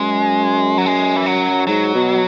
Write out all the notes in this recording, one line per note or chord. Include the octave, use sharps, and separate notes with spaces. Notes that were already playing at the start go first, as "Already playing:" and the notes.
Already playing: F#2 G#3
F#3
G#3
E3
F#3
G#2 F#3
B2